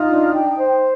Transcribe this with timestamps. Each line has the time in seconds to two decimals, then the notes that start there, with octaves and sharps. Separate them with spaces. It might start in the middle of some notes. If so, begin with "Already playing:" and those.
Already playing: D#4 F4
0.09 D4
0.34 G5
0.58 C5